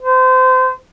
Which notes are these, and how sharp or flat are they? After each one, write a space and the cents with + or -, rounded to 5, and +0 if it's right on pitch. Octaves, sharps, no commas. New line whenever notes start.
C5 -30